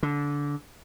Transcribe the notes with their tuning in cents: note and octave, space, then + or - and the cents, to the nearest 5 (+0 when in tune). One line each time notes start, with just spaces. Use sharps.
D3 -20